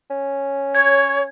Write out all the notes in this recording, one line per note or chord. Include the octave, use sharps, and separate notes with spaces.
C#4
C#5 G#6